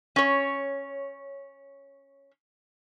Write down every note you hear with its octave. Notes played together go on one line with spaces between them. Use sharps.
C#4 C#5